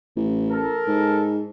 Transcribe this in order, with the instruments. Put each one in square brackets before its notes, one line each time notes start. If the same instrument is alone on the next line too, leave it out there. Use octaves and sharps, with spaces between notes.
[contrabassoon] A1
[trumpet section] A4 A#4
[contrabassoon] G#2